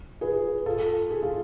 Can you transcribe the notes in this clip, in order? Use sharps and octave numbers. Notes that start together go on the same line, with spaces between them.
G#4 B4
F4 A4
G#4
F4